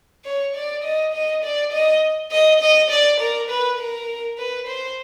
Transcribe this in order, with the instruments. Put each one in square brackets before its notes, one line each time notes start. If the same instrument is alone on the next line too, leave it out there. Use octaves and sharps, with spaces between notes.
[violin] C#5
D5
D#5
D#5
D5
D#5
D#5
D#5
D5
A#4
B4
A#4
B4
C5